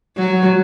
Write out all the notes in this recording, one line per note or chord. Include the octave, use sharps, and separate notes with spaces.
F#3